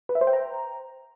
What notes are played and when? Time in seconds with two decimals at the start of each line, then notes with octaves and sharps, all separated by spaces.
0.09 B4
0.15 E5
0.21 C5
0.27 G5
0.33 A#5